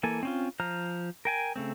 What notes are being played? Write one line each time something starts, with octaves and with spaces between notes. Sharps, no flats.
E3 A#3 A4 G#5
C4 C#4 F4
F3 C5 A#5 F6
A#4 G5 G#5
C#3 A3 C4